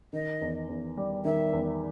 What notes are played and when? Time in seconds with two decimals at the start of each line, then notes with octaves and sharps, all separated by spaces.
0.13 D#3 D#5
0.41 E2
0.69 E2
0.97 G3
1.25 D#3 E5
1.53 E2